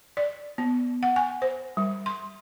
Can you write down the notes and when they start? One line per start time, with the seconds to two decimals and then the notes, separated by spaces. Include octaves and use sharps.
0.17 D5
0.58 B3
1.03 F#5
1.16 G#5
1.42 C5
1.77 G3
2.06 C6